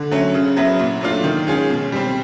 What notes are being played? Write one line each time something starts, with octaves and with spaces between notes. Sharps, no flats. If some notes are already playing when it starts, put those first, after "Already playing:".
Already playing: D3
F#3 A3 C#4
C#3
F#3 B3 E4
A#2
F#3 A3 D4 F4
D#3
G#3 C#4 F4 G#4
B2
G3 C4